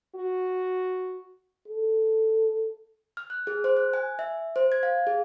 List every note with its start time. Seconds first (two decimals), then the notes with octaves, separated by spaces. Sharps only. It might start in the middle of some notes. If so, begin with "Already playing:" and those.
0.16 F#4
1.68 A4
3.17 F6
3.30 F#6
3.47 G#4
3.64 C5
3.77 F#6
3.93 G#5
4.19 E5
4.56 C5
4.72 G#6
4.83 F5
5.07 G#4